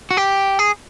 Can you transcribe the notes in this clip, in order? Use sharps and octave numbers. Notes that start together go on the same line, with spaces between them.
F#4
G4
G#4